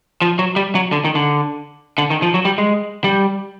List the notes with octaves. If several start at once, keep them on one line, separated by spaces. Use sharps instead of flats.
F3
F#3
G3
F#3
D3
D#3
D3
D3
D#3
F3
F#3
G3
G#3
G3